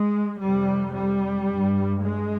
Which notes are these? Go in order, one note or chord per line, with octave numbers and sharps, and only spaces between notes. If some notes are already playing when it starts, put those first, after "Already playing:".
Already playing: G#3
F2 C3 G3
G3
G2
G#3